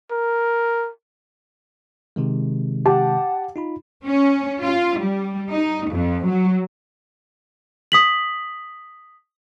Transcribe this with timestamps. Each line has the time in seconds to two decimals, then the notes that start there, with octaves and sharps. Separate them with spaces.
0.11 A#4
2.16 C3 D#3 G#3
2.85 G4 F#5 A5
3.56 D#4 F4 B5
4.06 C#4
4.62 F4
4.99 G3
5.51 D#4
5.89 F2
6.26 F#3
7.92 D#6 B6 F#7